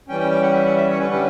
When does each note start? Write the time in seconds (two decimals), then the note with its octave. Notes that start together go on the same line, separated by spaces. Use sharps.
0.08 E3 G3 C#4 G5
0.20 G5
0.31 G5
0.43 F#5
0.54 E5
0.65 F#5
0.76 E5
0.88 C#5
0.99 D3 G3 C#4 B4
1.13 G4